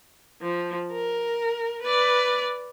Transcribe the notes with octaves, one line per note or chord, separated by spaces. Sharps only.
F3
A#4
B4 D5